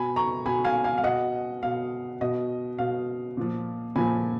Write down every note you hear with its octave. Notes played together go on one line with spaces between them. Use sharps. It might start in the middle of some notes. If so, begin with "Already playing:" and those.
Already playing: B2 G#5 B5
A#5 C#6
B2 G#5 B5
F5 G#5
F5 G#5
F5
B2 D#5 F#5
B2 F5
B2 D#5
B2 F5
A#2 F3
A#2 F3 G#5 B5